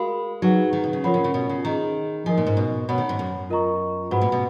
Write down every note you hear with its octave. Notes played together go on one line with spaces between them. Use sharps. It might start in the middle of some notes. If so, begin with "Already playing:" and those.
Already playing: G#3 F#4 A#4 F5 B5
F#3 D#4 G#4 B4 F#5
D#3
B2
C#3
F3 F4 A#4 C#5 F#5 B5
C#3
C#3
B2
C#3
D#3 G#4 D#5 A#5
F3 D#4 A#4 D#5 G#5
A#2
G#2
B2
B2 C#5 F#5 B5
D#3
G#2
F#2
F4 A#4 D#5 A#5 C#6
G#2 F#4 B4 F#5 B5
A#2
B2